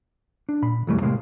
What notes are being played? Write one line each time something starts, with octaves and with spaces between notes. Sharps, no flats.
D4
A#2 B5
B1 F2 E3 G3 A3
A2 C3 G#3 A#3